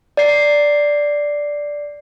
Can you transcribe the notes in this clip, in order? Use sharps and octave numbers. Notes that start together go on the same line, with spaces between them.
D5 C7